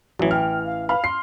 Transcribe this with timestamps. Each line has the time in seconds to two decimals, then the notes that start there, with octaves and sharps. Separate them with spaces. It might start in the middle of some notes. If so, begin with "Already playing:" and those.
0.19 A1 E3 F#3 C#5
0.31 G5 F6
0.65 F5
0.89 B4 F5 B5 F6
1.04 C6 C7